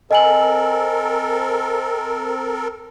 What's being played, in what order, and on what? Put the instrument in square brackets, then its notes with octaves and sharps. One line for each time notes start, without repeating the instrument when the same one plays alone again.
[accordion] C4 A4 A#4 [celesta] D#5 G#5 F#7